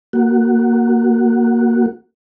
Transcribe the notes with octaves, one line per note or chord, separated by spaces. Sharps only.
A#3 F#4